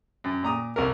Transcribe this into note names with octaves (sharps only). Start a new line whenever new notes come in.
F#2
A#2 A#5 D#6
C2 F2 A#4